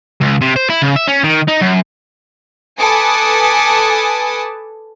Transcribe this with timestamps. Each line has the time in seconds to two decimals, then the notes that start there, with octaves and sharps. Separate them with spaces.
0.21 C#2
0.42 C3
0.56 C5
0.70 E4
0.82 C#3
0.96 E5
1.08 C#4
1.24 D#3
1.48 D#4
1.61 F#2
2.80 A4 B4 G#5 A5 D6 D#6